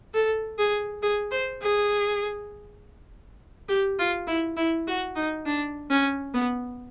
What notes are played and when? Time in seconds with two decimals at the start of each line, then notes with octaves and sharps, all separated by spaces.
0.14 A4
0.59 G#4
1.03 G#4
1.32 C5
1.62 G#4
3.69 G4
3.99 F4
4.27 E4
4.57 E4
4.88 F#4
5.16 D#4
5.46 D4
5.90 C#4
6.34 B3